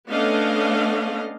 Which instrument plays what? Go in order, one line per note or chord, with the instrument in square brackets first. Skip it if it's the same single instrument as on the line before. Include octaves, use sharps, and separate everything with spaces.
[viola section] A3 B3 C#4 D4 D#5 F5